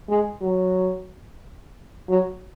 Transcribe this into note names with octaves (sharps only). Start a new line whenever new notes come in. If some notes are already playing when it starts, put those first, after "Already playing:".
G#3
F#3
F#3